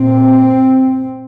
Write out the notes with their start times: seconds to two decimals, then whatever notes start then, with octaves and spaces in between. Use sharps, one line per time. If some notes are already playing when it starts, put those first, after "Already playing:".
Already playing: A#2 C4